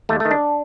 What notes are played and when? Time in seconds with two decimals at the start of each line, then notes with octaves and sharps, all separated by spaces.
0.09 D#2 A3
0.20 D#3 A3
0.31 D4